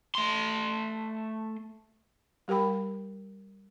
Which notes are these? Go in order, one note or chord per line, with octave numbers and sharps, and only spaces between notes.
A3 C6
G3 G4 A#4 G5 B5